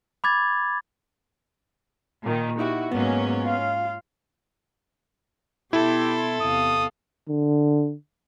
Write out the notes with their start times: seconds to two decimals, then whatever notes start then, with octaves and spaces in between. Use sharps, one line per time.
0.24 B5 D6 G#6 A6
2.22 A#2 D#3
2.59 D#4 E4 F#4 G4
2.91 G#2 F#3 A#3 B3 C#4
3.44 F4 F5
5.73 B2 E4 G4 A4 C6
6.41 E2 C3 F5 D#6
7.29 D3